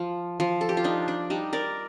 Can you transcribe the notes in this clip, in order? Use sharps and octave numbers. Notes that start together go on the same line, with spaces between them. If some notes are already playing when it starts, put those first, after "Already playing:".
Already playing: F3
F3
A4
G4
F4
D4 D#4
D4
G3 D#4
A#4 D5